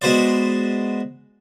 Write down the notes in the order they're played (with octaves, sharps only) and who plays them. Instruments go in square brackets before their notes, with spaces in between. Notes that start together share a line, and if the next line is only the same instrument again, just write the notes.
[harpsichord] G#3 B3 F#4 B4 C5 D5